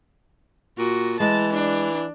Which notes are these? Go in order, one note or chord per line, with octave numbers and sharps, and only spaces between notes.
A#2 F#4
E3 G#3 A5
D4